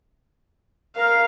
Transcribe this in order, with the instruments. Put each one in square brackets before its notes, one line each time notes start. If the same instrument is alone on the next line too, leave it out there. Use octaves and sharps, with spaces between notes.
[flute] A#4 [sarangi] F5